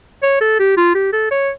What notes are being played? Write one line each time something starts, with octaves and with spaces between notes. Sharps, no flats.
C#5
A4
G4
F4
G4
A4
C#5